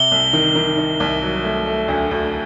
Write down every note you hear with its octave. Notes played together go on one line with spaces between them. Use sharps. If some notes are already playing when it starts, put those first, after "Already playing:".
Already playing: C3 G7
C2
D#3
D#3
D#3
C2
F#3
A3
A3
D2
D2